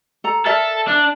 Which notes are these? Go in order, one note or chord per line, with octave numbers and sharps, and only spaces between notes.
A4 A#5
A4 A#4 D5 E5
D4